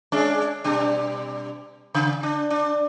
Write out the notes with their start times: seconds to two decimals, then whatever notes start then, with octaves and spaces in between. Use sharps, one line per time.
0.12 G#3 C#4 D4
0.64 B2 G3 D4
1.95 C#3
2.23 D4
2.50 D4